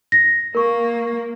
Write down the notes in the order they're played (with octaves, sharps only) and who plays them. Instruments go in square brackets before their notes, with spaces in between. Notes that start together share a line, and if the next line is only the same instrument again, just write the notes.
[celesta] A#6
[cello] A#3 [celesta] A#4 C#6